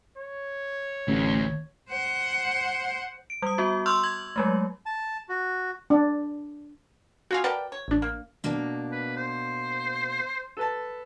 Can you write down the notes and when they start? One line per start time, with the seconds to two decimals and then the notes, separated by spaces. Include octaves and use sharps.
0.18 C#5
1.08 A1 D2
1.90 C5 F#5
3.30 D7
3.42 G3 D#6
3.58 B3 F#4
3.86 C6 C#6 E6 F6 G6
4.03 G#6 F#7
4.36 F#3 G#3 A3
4.86 A5
5.29 F#4
5.90 D4
7.31 C4 F4 F#4 G#4 F5
7.44 A#4 B4 D5 F#5 G5 A5
7.72 C#5
7.88 A1 D4
8.02 A#3
8.44 B2 A#3 D4
8.92 B4
9.17 C5
10.57 A4 B4 A5